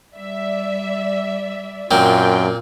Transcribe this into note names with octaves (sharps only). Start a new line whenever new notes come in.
G3 D5 E5
F#2 A#2 C4 F4 G5